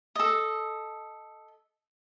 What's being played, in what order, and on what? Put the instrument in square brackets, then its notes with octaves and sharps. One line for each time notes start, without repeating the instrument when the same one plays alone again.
[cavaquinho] A4 D#5